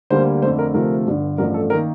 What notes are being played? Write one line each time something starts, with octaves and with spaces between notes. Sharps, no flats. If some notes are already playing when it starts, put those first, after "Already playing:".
D2 D3 G3 A#3 C5
F2 D3 A3 C5
A#4
D2 C3 F3 A3 A#4
G1 G2 D3
A1 G2 F3 A3 A#4
A4
D#3 A#3 A#4